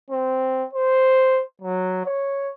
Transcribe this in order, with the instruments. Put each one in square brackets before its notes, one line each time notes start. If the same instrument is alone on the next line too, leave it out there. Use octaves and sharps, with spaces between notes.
[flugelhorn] C4
C5
F#3
C#5